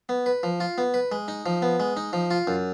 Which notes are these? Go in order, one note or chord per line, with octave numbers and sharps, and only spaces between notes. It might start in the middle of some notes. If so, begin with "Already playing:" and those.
B3
B4
F3
F4
B3
B4
G#3
D#4
F3
B3
G#3
D#4
F3
F4
F#2